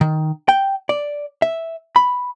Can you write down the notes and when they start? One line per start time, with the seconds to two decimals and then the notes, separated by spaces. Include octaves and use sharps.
0.01 D#3
0.49 G5
0.89 D5
1.42 E5
1.96 B5